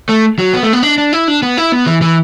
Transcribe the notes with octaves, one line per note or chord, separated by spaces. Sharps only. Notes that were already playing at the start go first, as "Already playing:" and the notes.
A3
F#3
B3
A3
B3
D4
D4
E4
D4
B3
E4
B3
E3
E3